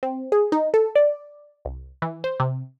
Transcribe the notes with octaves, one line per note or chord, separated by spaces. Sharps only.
C4
G#4
D#4
A4
D5
C2
E3
C5
C3